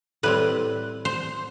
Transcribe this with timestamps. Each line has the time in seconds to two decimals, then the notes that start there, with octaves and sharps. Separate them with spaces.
0.23 A2 G3 C4 B4
1.05 C5